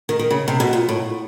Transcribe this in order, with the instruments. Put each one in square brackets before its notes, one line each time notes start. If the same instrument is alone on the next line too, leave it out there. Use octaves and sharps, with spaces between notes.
[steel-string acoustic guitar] D#3
D#3
C#3
C3
B2
A#2
A2